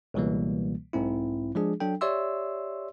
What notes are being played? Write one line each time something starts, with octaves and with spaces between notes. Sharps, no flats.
C#2 B2 E3 G3 A#3
B1 G#2 C4 E4
F3 G#3 D4 G#4
F#3 D4 A4 G5
G4 C#5 D5 E5 C6 E6